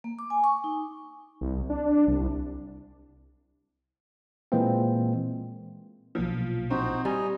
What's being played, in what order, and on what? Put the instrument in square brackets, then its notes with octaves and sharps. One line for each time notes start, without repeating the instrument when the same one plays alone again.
[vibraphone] A#3
D6
G#5
C#6
D#4
[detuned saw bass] C2
D4
C2
[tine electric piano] A#2 E3 G#3 A#3 C4
[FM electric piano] B1 A#2 [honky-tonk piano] F3
[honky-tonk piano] C4 [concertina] D#4 F#4 C5
[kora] G3 [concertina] D#5 G#5 A#5